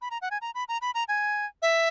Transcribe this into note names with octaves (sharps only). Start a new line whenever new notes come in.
B5
A#5
F#5
G#5
A#5
B5
A#5
B5
A#5
G#5
E5